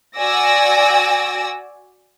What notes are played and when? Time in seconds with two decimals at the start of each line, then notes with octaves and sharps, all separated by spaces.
0.18 F#4 D5 G#5 E6 A#6